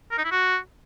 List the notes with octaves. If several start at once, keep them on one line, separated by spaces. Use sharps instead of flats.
A#4
D#4
E4
F#4